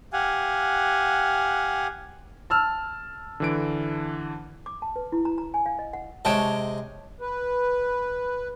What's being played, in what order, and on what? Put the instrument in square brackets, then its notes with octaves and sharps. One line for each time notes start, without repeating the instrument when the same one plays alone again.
[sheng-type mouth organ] G4 F5 F#5 G#5
[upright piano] A5 E6 F6
[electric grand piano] D3 E3 D7
[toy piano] D6
A5
B4
E4
A#5
A#5
G#5
F5
D#5
F#5
[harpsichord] C3 G#3 [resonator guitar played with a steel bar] C#5 G5 A5
[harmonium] B4